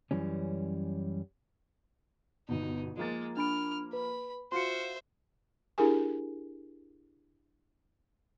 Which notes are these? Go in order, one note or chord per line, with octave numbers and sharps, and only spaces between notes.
F#2 E3 G3 C#4
G1 B2 D#4
F3 G#3 A#3 A6
D4 B5 F6 D7
B4 B5
F4 F#4 C5 E5 C6 C#7
D4 E4 G4 G#4 A#4 G#5